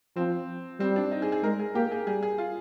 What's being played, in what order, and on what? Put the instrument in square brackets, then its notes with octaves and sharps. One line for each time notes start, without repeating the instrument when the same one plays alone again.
[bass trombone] F3 [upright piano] C4
[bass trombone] G3 [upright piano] C4
[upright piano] D4
D#4
G#4
G#4
[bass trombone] G#3 [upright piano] A#4
[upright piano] G#4
[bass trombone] A#3 [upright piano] G4
[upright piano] G#4
[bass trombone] G3 [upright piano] G#4
[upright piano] G#4
F4